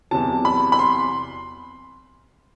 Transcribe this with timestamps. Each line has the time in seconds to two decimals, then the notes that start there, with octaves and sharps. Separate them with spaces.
0.11 E2 C3 F#3 A5
0.45 B5
0.72 B5
0.79 C6